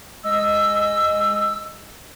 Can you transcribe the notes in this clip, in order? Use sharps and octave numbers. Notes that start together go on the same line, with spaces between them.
G#3 D#5 E6